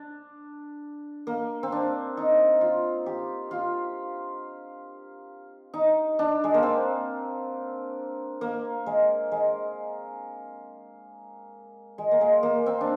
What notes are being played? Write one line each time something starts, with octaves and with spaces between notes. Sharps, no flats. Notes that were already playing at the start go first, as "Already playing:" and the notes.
Already playing: D4
A#3
C4
D4
D#4
F4
G4
F4
D#4
D4
G#3
A#3
C4
A#3
G#3
G#3
G#3
A#3
G#3
A#3
C4
D4